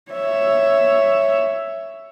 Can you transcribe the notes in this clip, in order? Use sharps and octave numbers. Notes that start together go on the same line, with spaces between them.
C#5 E5